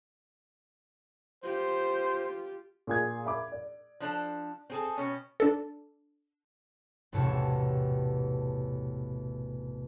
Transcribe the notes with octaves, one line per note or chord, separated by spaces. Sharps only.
F4 G4 C5
A#2 G#4 G#6
E5 B5 D6
D5
F3 D4 A4
C4 G#4 A4
B2 C#4
D4 A4
E1 A1 E2 C3 C#5 A5